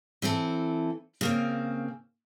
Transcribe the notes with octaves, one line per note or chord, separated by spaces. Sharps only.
E3 C4 E4 A4
C#3 A#3 C4